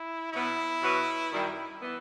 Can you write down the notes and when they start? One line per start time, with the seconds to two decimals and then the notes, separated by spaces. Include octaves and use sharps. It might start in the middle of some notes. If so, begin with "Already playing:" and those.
Already playing: E4
0.32 B2 F#3 B3 E4
0.81 B2 F#3 B3 F#4 B4
1.31 F#2 D#3 G3
1.80 E3 B3